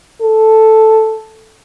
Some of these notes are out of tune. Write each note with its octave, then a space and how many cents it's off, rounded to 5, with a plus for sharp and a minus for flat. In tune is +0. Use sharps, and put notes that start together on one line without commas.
A4 +0